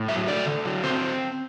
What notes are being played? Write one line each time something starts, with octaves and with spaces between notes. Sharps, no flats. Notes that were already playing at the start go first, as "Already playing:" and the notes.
Already playing: A2
F#3 E5
A3 D5
D3
F#3
C4 C5